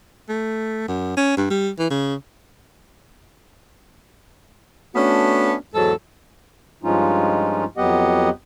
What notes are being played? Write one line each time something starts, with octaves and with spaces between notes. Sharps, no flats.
A3
F#2
C#4
G2
G3
E3
C#3
A3 B3 C#4 D4 F#4
E2 G#2 F#3 A4
G2 F3 G#3 C#4 D#4 F4
F2 F#3 B3 G4 D#5 F#5